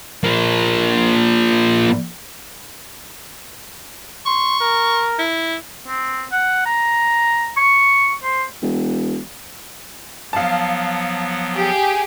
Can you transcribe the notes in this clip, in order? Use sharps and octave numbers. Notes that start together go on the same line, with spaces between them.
F3 A#3
C6 C#6
A#4
E4
C4
F#5
A#5
C#6
C5
E1
F3 F#3 B3 F5 A5
G4 G#4